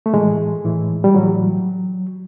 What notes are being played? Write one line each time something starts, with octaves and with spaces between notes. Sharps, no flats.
A3
A2 E3 G#3
A2 E3
G3
A2 E3 F#3